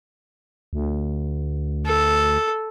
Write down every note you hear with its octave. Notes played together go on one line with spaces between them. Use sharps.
D2
A4